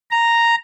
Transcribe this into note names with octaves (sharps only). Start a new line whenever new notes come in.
A#5